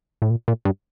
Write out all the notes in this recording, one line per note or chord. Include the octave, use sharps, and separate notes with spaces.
A2
A#2
A#2
G2